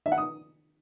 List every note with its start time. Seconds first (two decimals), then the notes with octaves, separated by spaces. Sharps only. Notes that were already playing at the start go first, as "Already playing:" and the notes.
0.06 E5
0.12 F#5
0.18 D#6